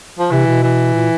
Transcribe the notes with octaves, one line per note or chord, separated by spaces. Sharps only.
F3
C3 E3
B2
E3
A#2